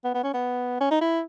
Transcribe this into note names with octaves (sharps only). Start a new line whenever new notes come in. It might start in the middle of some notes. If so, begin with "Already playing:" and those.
B3
B3
C#4
B3
C#4
D#4
E4